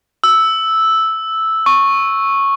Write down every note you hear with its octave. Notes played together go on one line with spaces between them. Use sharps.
E6
C#6